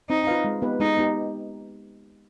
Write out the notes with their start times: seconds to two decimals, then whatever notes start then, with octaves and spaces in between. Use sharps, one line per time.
0.09 C4 D#4
0.27 F4 B4 F5
0.44 G#3
0.62 B3 D#4 G4 B4
0.79 G#3 D#4
0.97 B3 D#4 G4